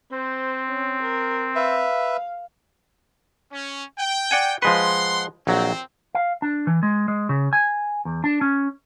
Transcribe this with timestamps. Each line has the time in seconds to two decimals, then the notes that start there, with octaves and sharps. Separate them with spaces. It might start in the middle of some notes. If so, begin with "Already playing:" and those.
0.11 C4 C5
0.70 C#4
1.02 A#4
1.55 B4 E5 F5
3.52 C#4
3.98 G5
4.31 D5 F#5 G#5
4.62 F3 G#3 B4 F#5 C6
5.47 A#1 F#3 C4
6.15 F5
6.42 D4
6.67 E3
6.83 G#3
7.08 G#3
7.29 C#3
7.53 G#5
8.05 E2
8.24 D4
8.41 C#4